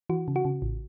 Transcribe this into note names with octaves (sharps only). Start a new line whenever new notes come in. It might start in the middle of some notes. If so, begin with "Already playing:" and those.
E3 F#4
C#3
F#4
C#3
A1